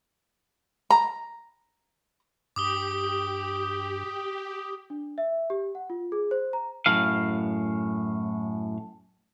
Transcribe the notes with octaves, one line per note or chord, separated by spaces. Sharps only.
A#5
G2 G4 D6 D#6 G7
D4
E5
G4
F#5
F4
G#4
C5
A#5
F#2 A2 F5